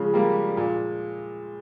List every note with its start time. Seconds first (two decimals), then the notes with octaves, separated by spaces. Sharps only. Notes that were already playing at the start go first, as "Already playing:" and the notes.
Already playing: C#3 F3 G#3
0.13 G3 A#3
0.57 A#2